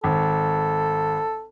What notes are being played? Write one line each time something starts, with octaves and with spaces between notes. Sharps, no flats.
G#1 A4